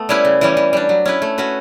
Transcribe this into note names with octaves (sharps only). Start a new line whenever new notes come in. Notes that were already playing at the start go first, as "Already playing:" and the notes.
Already playing: A3 B3
G3 C#4 E4 B4
C#3
E3 G3 C#4
E3
G3 D4
F#3
C#4 E4 B4
A3
C#4 F#4 B4